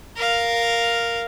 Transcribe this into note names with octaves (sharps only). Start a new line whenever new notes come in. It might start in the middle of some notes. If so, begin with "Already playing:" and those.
A#4 F5